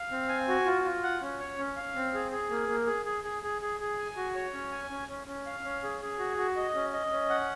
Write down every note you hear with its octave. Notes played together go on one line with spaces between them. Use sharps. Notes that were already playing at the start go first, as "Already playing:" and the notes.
Already playing: F5
C4
G#5
F#4
F4
F4
F#5
C#4
C#5
C#4
F5
C4
G#4
G#4
A#3
A#3
G#4
G#4
G#4
G#4
G#4
G#4
G#5
F#4
C#5
C#4
G#5
C#4
C#4
C#4
F5
C#4
G#4
G#4
F#4
F#4
D#5
C#4
D#5
C#4
F#5